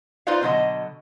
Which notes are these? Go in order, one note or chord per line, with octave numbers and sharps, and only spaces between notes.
D#4 F4 B4 C5 D5 F5
B2 D3 F#3 D#5